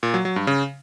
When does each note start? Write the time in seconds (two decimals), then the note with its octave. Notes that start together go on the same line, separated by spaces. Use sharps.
0.03 A#2
0.14 F#3
0.25 F#3
0.36 G2
0.47 C#3